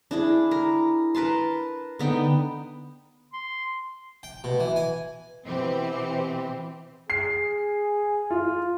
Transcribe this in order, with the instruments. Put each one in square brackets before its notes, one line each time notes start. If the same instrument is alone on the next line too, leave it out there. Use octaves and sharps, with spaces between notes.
[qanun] D4 E4 G#4
A#4
A#4 B4 A5 C6
D3 B3 D#4 G5
[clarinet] C6
[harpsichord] G5
B2
E3
G#5
[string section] B2 E3 C4 G4
[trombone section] G#4 [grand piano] C7
[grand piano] F4